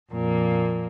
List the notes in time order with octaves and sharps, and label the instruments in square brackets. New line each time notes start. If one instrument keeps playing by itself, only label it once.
[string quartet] F2 A#2 A#3